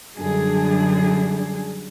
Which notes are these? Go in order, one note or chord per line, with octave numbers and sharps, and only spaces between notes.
F#2 D3 G3 D4 G#4